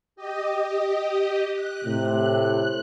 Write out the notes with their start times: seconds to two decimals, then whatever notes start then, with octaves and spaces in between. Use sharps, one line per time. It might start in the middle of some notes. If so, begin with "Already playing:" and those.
0.16 G4 D#5
1.53 F#6
1.85 A2 C3